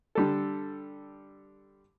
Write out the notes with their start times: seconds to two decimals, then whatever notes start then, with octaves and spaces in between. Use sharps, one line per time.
0.15 D3 G3 A4